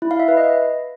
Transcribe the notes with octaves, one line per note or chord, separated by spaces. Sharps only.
E4
F5
E5
B4
D#5